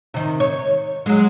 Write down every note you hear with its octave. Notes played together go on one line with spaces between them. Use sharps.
C3 D#3
C#5
F#3 G#3